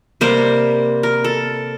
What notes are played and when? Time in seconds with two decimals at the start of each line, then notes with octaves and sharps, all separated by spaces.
0.21 C3 G3 A#3 C5
1.03 A#4
1.24 A4